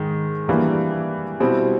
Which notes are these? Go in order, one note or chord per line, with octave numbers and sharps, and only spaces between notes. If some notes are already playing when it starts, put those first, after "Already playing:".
Already playing: G#2 D#3 G#3
E3 G3 A#3 D4
B2 G3 C4 E4